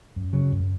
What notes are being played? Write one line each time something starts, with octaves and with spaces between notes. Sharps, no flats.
F#2
C#3 F#3
F#2